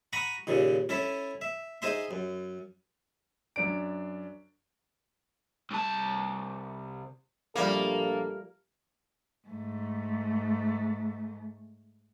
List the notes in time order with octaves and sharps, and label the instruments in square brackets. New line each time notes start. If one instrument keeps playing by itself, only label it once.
[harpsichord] F#5 A#5 B5 C#6 D#6
D#2 A#2 C#3
C#4 E4 A4 E5
E5
D#4 G#4 C5 E5 C6
F#2
[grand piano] F#2 D4 D7
[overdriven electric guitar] C2 A5
[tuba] A#1 [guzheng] F3 G3 A3 [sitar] A#3 [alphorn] A4
[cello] G#2 A3